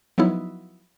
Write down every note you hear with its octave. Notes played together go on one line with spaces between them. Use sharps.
F3 F#3 B3 D#4 E4